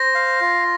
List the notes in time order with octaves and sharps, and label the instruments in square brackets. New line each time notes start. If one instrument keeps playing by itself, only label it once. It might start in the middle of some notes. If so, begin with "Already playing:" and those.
Already playing: [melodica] C5 [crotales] A#6
[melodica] F5
F4